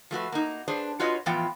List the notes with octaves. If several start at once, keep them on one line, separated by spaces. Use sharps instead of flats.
F3 A3 F#4 B4
A#3 D#4
D4 G#4 B4 C5
F4 F#4 B4 C#5 D#5
A2 E3 F3 B3 F4 G5